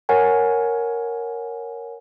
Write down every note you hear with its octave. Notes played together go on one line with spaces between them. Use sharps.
A#4 C#5 F#5 G#5